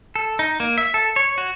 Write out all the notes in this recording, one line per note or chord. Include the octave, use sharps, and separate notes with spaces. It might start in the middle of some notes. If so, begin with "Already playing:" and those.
A4
D#4
A#3
E5
A4
C#5
F#4